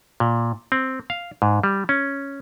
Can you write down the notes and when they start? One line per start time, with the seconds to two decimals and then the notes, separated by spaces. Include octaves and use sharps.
0.20 A#2
0.72 C4
1.10 F5
1.42 G#2
1.63 G3
1.89 C#4